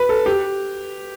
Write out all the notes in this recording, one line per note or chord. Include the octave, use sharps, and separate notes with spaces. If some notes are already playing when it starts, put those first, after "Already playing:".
Already playing: B4
A4
G4